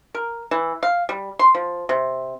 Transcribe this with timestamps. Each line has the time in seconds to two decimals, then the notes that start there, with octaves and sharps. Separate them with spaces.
0.14 A#4
0.51 E3
0.83 F5
1.09 G3
1.39 C6
1.55 F3
1.89 C3